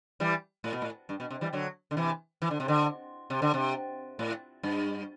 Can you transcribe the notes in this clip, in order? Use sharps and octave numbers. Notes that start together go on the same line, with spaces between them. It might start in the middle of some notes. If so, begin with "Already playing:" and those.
E3 G3
A2
B2
A2
G2
B2
C3
E3 G3
D3 F#3
D3
C3 E3
E3
D3
C3
D3
C3
D3
C3
A2
G2